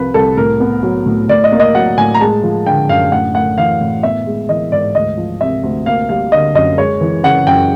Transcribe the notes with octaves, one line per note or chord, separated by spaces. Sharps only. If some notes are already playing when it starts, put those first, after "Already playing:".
Already playing: C2 C3 F3 B4
C2 A4
A2 A#4
B3
F#3
A2
A2 D5
D#5
A#3
D#5
F#3 F#5
A2 G#5
A#5
G#3 A5
F3
D3 G5
F#2 F5
A2 F#5
A3 F#5
E3 F5
A2
B3 E5
G#3
E3 D#5
G#2 D5
D2 D#5
F3
C3 E5
D2
A#3 F5
G3 F5
D3 D#5
F#2 D#5
G#3 C#5
E3
C#3 F#5
F#2 G5